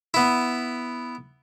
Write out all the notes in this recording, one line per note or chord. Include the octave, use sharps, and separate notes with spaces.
B3 E4